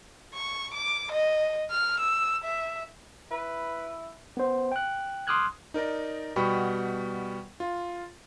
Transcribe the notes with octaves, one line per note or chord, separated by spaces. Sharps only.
C#6
D6
D#5
F6
E6
E5
E4 B4
B3 C5
G5 F#6
C6 D6 D#6 F6 F#6 G#6
D#4 A#4 D5 A#5
B2 G3 B3 G5 B5 C#6
F4